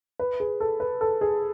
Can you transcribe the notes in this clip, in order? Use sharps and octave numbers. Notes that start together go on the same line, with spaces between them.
B4
G#4
A4
B4
A4
G#4